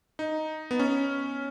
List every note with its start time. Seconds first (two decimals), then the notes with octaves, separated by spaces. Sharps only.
0.19 D#4
0.71 B3
0.79 C#4